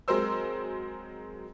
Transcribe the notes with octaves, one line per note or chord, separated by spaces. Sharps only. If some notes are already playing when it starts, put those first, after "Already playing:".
F#3 G#3 C4 A#4 C5 E6